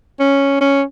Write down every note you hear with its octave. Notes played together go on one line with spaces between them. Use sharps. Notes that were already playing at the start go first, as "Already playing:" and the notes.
C#4
C#4